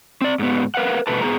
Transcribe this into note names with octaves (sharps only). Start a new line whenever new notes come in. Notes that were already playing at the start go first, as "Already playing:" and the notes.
C4 D5
G#2 B3
A#4 B4 F5 F#5
G2 B2 A3 B4 A5
G#2 G#3 B3 F#4 G#4 A#5